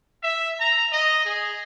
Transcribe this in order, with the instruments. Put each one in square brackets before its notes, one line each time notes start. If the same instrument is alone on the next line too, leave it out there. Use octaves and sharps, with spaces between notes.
[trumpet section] E5
A#5
D#5
G#4